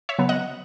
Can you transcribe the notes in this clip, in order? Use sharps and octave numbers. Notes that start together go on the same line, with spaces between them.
C#5 E5
C#3 F#3 B3
D#5 F#5